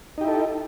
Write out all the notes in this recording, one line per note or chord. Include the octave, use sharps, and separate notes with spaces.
D#4 E4 G4 A4